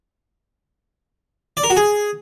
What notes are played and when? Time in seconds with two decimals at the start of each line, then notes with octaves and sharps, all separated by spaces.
1.57 D5
1.64 A#4
1.70 F#4
1.77 G#4